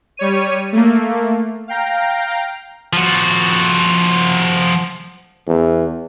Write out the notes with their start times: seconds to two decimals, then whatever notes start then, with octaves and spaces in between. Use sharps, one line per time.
0.17 G3 C#5 D#7
0.73 A3 A#3
1.68 F5 G5 A#5
2.93 F3 F#4
5.47 E2